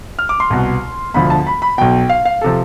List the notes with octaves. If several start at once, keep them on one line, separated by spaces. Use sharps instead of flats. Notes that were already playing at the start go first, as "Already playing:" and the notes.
F6
D6
C6
C2 B2
E1 D2 D3 F3 B5
A5
B5
B5
B1 B2 G5
F5
F5
C3 F3 A4